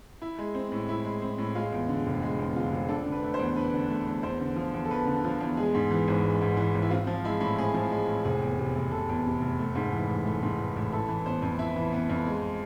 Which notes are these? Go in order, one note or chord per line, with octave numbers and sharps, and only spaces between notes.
E4
G#3
C4
A2
E4
G#3
C4
A2
G#3 F4
E2
D3
F1
G#3
E2
D3 F4
F1
D4 A4
D3
B4
A3
C5
E2
D4 B4
D3
A3
E2
E2 C5
D3
F3
E2
A4
E2 B4
D3
F3
E2
G#3 G#4
G#2
E3
G#1
G#3
G#2
E3
G#1
E4
C4 F4
F3 F4
G#3 E4
A2 E4
C4 G#4
F3
G#3
A2
F1 G#4
E2
C3
F1
F1 A4
E2
C3
F1
A3
G#2
E3
A1
A3
G#2
E3
A1
E4 A4
E3
B3 C5
F2
E4 E5
E3
B3
F2
G#3